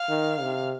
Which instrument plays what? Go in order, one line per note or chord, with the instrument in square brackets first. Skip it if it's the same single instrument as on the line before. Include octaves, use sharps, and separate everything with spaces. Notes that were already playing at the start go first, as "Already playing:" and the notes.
Already playing: [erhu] F5
[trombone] D#3
C3